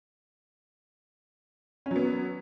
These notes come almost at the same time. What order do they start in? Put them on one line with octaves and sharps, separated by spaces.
C#4 F#3 B3